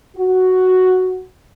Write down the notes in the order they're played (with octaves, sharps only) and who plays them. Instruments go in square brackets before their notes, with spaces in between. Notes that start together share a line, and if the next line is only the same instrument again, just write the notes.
[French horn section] F#4